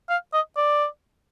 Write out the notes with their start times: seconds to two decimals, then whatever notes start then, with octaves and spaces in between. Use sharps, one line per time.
0.10 F5
0.34 D#5
0.57 D5